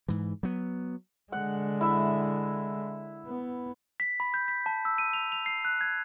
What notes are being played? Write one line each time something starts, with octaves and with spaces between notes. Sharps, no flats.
G#2 E3
F#3 B3
D3 G#3 F#5
E4 E5
B3
B6
B5
G6
B6
A5
E6
D#7
F7
F7
C7
F#6
G#6